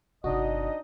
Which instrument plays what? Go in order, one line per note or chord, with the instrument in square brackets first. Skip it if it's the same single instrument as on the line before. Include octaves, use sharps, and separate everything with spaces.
[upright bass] G1 C3 [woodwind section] D4 D#4 D#5 [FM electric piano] F#4